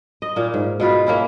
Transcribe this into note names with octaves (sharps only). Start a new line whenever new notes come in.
D#5
A#2 A#3
G#2
B2 F4 B4
A#3 C#4 E4